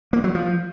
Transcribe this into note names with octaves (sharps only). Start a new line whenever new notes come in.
A#3
F#3
F3